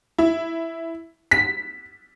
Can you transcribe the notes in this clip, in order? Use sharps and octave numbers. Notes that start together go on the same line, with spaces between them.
E4
B6